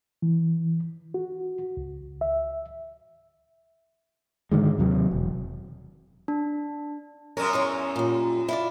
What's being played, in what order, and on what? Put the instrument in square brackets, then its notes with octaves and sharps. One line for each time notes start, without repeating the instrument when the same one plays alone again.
[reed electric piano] E3
F#4
C#2
E5
[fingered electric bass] G#2 D3 D#3 G#3
D#2 C3 F#3
E1
[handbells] D4
[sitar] F#2 C#4 [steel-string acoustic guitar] A#4
[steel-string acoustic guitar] E2 A#4 C#5
A#2 G3
E4 F4 D5